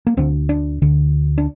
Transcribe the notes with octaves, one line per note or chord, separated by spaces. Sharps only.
A#3
D2 D3 C4
D4
D2 D3
D4